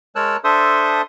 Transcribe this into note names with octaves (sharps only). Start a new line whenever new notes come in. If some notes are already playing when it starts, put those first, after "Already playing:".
G#3 A#4 C#5 A5 E6 F#6
D4 A4 C5 E5 C6 D#6